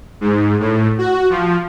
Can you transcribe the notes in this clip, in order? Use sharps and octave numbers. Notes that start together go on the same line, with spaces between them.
G#2
A2
F#4
F3